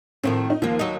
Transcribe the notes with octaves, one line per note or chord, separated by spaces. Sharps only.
A2 D#3 F3 C4
D#4
D#2 F3 A#3
F#3 D#4